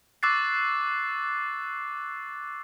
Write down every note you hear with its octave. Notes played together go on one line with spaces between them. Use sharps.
C#6 D6 E6 F#6 A6 C7